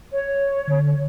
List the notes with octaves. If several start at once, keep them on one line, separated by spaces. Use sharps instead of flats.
C#5
D3